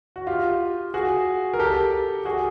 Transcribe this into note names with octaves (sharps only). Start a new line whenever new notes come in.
F#4
F4 G4
F#4 G#4
A#4
G4 A4
F#4 G#4